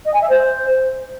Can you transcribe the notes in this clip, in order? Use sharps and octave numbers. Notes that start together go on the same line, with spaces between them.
D#5
G#5
E5
C5